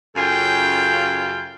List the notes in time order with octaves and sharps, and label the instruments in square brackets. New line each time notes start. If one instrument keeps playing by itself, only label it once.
[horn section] F#2 C#3 F4 A4 G5